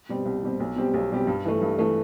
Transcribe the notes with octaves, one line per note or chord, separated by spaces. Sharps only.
B2 G3 C4
C2
B2 G3 C4
B1
B2 G3 C4 G4
B1
B2 G3 C4 G4
G2
E3 A3
G2
E3 A3